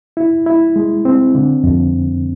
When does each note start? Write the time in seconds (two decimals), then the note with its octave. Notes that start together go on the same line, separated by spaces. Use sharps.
0.17 E4
0.46 E4
0.76 G#3
1.05 C4
1.35 D3
1.64 F2